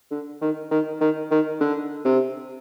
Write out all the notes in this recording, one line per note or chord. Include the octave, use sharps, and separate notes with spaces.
D3
D#3
D#3
D#3
D#3
D3
C3